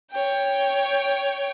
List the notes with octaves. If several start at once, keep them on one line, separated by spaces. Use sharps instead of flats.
C#5 G5